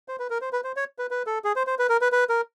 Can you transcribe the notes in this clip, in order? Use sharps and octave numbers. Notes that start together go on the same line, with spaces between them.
C5
B4
A#4
C5
B4
C5
C#5
B4
B4
A4
G#4
C5
C5
B4
A#4
B4
B4
A#4